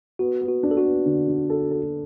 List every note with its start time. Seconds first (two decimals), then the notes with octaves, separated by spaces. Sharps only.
0.19 B3 F#4
0.41 B3
0.48 F#4
0.63 D4
0.71 A4
0.77 F#4
0.85 B3
1.06 D3
1.28 D3
1.50 A4
1.71 A4